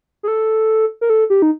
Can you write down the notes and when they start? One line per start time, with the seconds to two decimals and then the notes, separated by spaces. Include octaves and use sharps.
0.23 G#4
0.28 A4
1.01 A#4
1.10 A4
1.30 G4
1.42 D#4